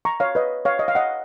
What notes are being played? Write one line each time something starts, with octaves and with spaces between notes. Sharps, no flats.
A#5 C#6
C#5 F5
B4 D#5
C#5 F5
D#5
F5
D#5 F#5